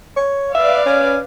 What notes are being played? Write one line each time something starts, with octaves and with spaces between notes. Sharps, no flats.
C#5
B4 D5 E5 F5
C#4